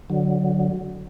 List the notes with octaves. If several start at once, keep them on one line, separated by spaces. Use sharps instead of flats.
D3 F#3